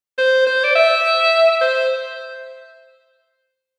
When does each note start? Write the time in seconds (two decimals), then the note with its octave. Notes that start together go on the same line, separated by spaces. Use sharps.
0.18 C5
0.47 C5
0.64 D5
0.75 E5
1.61 C5